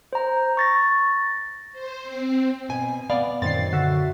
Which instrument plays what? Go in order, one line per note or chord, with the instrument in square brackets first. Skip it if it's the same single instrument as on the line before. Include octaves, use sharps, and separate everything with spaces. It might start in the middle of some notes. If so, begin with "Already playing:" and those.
[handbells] C5 A#5
C#6 A6 A#6
[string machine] C5
C4
[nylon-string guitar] B2 G#5
[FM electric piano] B3 [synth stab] D5 [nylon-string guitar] F5
[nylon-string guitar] F#2 [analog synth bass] A#2 [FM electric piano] D#3 C4 [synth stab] A6 C7
[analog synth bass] D3 [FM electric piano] F#4 E5